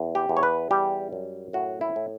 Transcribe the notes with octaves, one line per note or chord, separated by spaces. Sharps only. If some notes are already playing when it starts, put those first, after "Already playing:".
Already playing: E2
G4
E2
C#5
B4
G3 G4
F#2
A2 F#4
E4
A2